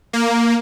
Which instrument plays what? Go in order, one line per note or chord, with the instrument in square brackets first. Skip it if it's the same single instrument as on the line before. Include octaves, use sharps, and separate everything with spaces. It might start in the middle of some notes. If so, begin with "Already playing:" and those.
[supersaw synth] A#3